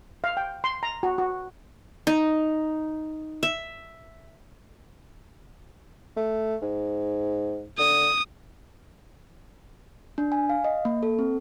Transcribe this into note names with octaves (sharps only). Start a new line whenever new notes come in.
F5
G5
C6
A#5
F#4
F#4
D#4
E5
A3
G#2
D3 D#6
D4
G#5
F5
D#5
A#3
A4
C4